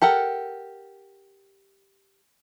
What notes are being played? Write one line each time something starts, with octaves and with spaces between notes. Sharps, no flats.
G4 A4 A#4 F#5